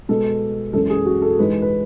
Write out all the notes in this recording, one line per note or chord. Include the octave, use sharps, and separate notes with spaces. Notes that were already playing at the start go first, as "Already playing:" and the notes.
B2 G#3 B3 A4
F#2 E3 G#3 A4
G#4
F#4
A4
G#2 E3 G#3 B4
B4